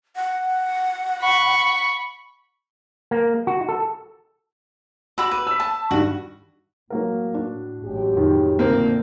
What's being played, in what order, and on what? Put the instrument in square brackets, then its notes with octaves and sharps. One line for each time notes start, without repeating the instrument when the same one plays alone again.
[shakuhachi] F#5
[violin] B5 C#6
[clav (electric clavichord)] A#3
F#4
A4
[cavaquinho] F#4 B5 D6 [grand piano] E6
[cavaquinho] B4 [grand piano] D#7
[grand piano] E6 B6
[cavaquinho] A5
[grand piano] G2 D#3 [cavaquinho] F#4
[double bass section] A2 [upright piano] F#3 A#3 A#4
[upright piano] D4 F#4
[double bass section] A1 [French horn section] F#3 G#3 G4
[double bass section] F2 [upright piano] A2 D#3
[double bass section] A#2 D3 A3 [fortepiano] A#3 C4